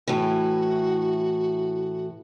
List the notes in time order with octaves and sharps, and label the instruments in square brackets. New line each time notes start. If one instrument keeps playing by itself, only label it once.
[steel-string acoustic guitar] A2 E3 [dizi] F#4